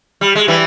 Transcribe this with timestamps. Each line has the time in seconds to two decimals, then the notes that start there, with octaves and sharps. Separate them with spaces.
0.21 G3
0.35 G#3
0.48 E3 G3